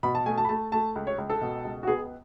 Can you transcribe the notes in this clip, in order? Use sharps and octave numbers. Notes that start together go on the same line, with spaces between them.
B2 B5
A5
A3 G#5
A5
B5
A3 A5
A3 A5
C#2
C#5
C#2
A4
B2
C#2
F#4
B3 G#4